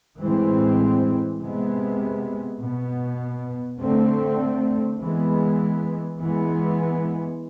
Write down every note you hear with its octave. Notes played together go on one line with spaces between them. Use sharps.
A2 E3 G#3 C4
C3 G#3 B3
B2 B3
D3 A3 C4
E3 G#3 B3
E3 G#3 B3